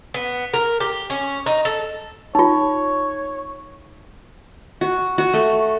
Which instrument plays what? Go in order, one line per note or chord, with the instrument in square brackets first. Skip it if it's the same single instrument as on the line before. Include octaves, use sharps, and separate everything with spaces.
[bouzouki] B3
A#4
G4
C#4
D#4
A4
[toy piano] D#4 F4 [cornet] C#5
[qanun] F#4
F#4
A3